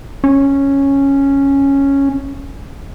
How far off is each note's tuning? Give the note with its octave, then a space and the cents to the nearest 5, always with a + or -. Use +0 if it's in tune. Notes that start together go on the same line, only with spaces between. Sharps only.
C#4 -5